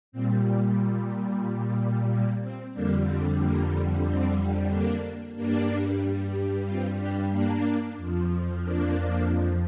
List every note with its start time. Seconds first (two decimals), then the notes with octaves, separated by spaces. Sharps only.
0.12 A#2 G3 C4
2.08 A#3
2.41 C4
2.73 F2 D3 G3 A#3 D4
3.06 C4
3.38 A#3
4.04 C4
4.69 A#3 D4
5.34 G2 G3 A#3 D4
6.65 C4 F4
6.98 D4 G4
7.30 A#3 D4
7.96 F2 F3
8.61 A#3 D4